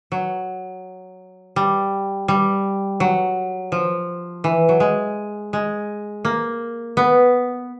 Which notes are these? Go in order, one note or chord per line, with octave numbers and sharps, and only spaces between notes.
F#3
G3
G3
F#3
F3
E3
F#3
G#3
G#3
A#3
B3